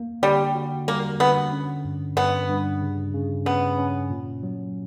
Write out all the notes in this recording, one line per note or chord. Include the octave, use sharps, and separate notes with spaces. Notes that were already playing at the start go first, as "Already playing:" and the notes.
Already playing: A#3
D3 G3
F#4
G3 A#3
D3 B3
C#4
G2
G2 B3
G2
C#3
C#3
B3 C#4
C#4
A#2
F#3